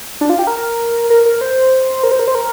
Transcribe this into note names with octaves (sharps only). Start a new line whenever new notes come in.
D4
F4
G4
A#4
A#4
A#4
C5
A#4
C5
A#4
C5
A#4